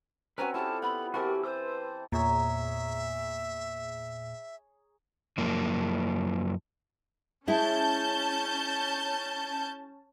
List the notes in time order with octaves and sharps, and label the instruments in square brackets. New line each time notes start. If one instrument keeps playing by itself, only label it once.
[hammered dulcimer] C4 C#4 F#4 [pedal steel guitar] B4 A#5 [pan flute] G#5
[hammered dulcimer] E4 G4 D5 [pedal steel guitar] F4 A4 F6 [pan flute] A5
[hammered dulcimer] B3 [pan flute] B5
[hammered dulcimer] E3 C4 A4 [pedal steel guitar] F#4 G4 [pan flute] A#4
[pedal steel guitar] B4 C6 E6 [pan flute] C5
[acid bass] E2 [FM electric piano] A#2 [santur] G#4 C#5 A#5 [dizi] E5
[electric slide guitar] F#2 F3 A#3
[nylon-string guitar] G#3 E4 [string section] C#4 A5 G6